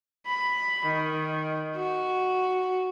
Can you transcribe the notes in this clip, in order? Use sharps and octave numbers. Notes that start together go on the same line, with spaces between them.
B5
D#3
F#4